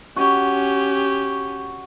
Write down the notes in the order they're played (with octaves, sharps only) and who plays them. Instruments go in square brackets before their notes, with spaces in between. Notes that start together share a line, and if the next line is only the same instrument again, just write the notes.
[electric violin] C#4 G4 [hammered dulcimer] F#4